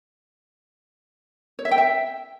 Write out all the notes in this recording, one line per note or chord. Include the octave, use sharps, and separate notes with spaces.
C#5
E5
G5
E5